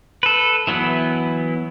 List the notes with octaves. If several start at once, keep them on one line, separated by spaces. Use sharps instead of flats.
A4 B4
E3 F#3 B3 E4